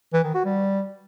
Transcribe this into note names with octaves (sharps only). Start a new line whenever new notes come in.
E3
D#3
F#4
G3